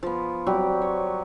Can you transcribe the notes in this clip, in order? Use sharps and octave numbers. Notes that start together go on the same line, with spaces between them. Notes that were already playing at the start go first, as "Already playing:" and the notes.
F3 B3
F#3 G3 C4 G4
C#5